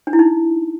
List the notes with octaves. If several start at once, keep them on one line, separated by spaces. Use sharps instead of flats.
D4
E4
D#4